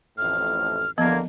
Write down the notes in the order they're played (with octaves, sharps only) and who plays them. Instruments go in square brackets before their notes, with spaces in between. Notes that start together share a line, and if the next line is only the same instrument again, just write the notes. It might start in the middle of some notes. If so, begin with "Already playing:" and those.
[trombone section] A1 F2 A2 [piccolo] F6
[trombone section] E2 D3 A#3 [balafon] F3 B3 [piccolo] G#6